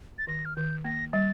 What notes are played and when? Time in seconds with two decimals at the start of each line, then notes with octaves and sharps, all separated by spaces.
0.18 A6
0.27 D#3 A#6
0.45 F6
0.56 D#3 G6
0.84 A#3 A#6
1.13 G3 A6